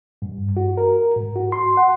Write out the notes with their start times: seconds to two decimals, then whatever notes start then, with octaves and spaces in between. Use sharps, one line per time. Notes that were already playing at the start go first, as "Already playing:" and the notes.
0.22 G2
0.57 F#4
0.77 A#4
1.16 G#2
1.36 F#4
1.52 C6
1.77 F#5